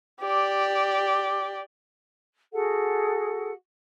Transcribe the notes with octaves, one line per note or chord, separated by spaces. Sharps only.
G4 D5
F#4 G#4 A4 F#5